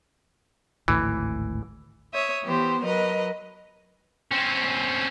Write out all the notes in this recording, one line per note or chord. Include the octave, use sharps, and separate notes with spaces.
G#1 D2 A2 E3
C#5 E5 D#6
E3 B3 G4 C5
F#3 A#4 B4 D#5
C4 C#4